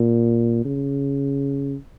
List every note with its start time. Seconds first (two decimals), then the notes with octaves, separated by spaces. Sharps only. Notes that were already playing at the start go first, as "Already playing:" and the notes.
Already playing: A#2
0.65 C#3